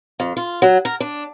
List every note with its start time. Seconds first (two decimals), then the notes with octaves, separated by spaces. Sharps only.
0.20 F2
0.37 F4
0.62 F#3
0.85 A#4
1.00 D4